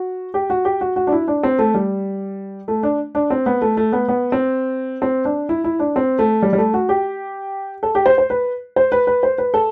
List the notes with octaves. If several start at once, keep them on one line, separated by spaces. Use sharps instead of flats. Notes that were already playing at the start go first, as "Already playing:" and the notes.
Already playing: F#4
G4
F#4
G4
F#4
F#4
D4
E4
D4
C4
A3
G3
A3
D4
D4
C4
B3
A3
A3
B3
B3
C4
C4
D4
E4
E4
D4
C4
A3
G3
G3
A3
F#4
G4
A4
G4
C5
C5
B4
C5
B4
B4
C5
B4
A4